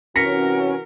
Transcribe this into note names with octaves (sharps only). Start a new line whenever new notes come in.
C3 E3 C#4 F#4 A#4 A#6 B6 C#7